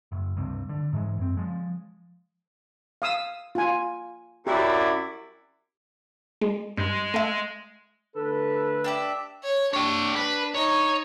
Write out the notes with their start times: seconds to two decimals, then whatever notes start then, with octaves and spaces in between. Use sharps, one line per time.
0.12 F#1
0.37 C#2 G2 C3
0.69 D3
0.93 G#2 E3 F3 G#3
1.18 F#2 C4
1.37 F3 G#3
3.02 F5 D#6 E6
3.55 F4 G#5
4.47 F#2 E4 G4 D5
6.41 G#3
6.77 G2 G#3
7.14 A3 E5
8.16 D3 A3 A4 B4
8.84 D4 G4 E5
9.44 C#5
9.73 D4 G4 C#5
10.16 B4
10.55 D#4 C#5